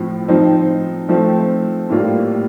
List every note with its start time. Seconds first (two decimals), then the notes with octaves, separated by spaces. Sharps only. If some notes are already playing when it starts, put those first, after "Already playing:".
Already playing: A2 F3 C4
0.28 F3 C4 D#4
1.09 F3 A3 C4
1.89 A2 G3 A#3 F4